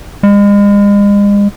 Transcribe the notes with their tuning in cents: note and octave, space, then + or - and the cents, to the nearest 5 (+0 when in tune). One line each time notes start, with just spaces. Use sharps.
G#3 -40